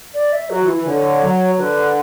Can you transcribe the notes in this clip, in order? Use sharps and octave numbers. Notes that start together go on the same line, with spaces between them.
D5
E5
F#3 F#4
E3
E4
E3
D3 C#5
F#3
D3 B4